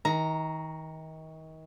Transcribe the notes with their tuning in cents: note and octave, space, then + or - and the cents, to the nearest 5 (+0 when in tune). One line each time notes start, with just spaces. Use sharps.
D#3 +35 A#5 +0